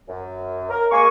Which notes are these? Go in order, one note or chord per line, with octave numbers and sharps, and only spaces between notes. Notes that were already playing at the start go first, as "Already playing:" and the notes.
F#2
A#4
G#3 A#3 G#5 C#6